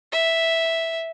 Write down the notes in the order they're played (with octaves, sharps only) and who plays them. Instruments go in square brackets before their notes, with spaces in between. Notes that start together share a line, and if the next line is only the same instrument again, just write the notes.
[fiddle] E5